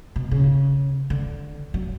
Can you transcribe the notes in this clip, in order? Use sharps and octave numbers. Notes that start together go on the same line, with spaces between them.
B2
C#3
D3
F#3